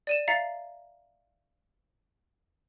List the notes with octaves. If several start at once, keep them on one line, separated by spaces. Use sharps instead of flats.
D5 D#7 E7
E5 F5 A#5 A6 C7 C#7